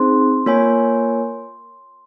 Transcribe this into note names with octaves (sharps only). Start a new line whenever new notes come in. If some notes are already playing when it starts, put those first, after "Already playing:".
Already playing: C4 D#4 G#4 C5 C6
A#3 F4 A#4 C#5 G#5